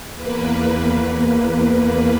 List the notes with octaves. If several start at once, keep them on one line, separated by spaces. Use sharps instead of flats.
E2 A#3 B4